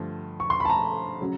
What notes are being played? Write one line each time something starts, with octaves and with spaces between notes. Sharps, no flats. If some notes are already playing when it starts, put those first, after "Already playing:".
Already playing: G2 D3 F3 A3
C#6
C6
A5 B5
A#5
C#3 F#3